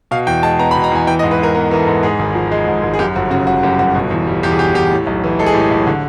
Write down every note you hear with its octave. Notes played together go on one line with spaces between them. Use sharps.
B2 F5
E2 G5
G#3 A5
B3 A#5
B5
B2
A#5
E2 G#5
E3 G5
D#5
G#2
B4
G#3 A#4
B3 A#4
E3 A#4
A4
G#2
G#2 G#4
G#1
F3
G#3
G#2
G#1
G#4
F#2 G4
G1 F#4
C#3 F#4
G1 F#4
F#2 G4
G1 F#4
B2
E2
G3
E2 G4
G#4
B2 G4
E2 G4
A2
B1
E3
G#3 A4
G#4
A2 G4
G#4
B1
D3